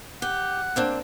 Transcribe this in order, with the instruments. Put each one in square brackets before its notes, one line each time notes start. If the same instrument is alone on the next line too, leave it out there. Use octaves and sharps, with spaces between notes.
[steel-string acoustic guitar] G4 [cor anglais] F#5
[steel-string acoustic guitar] A#3 C4 D4